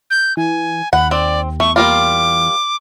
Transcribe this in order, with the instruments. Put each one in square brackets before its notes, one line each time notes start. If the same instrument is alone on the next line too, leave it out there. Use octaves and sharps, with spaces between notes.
[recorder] G6
[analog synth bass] E3 [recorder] G#5
[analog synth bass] D#2 [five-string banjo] F#5 [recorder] B5
[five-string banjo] C4 [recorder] D5
[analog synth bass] E2 [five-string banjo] A3 [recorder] C#6
[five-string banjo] G3 A#3 F4 [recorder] D6